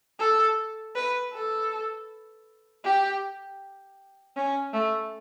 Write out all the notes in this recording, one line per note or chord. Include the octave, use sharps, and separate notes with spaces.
A4
B4
A4
G4
C#4
A3